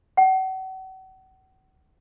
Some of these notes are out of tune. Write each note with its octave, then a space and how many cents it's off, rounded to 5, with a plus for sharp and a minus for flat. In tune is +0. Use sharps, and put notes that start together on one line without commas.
F#5 +40